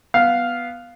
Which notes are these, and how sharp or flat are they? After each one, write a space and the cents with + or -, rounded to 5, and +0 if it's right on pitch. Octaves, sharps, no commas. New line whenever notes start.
B3 +0 F5 +0